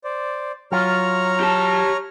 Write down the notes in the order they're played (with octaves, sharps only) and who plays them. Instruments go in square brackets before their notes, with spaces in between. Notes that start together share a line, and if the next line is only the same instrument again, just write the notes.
[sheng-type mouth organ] C5 D5
[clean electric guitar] F#3 F4 [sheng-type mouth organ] C#5 A#5 F6
[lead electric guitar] G4 A5